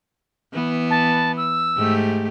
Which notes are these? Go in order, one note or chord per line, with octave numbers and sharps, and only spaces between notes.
E3 B3
A5
E6
G#2 A3 G4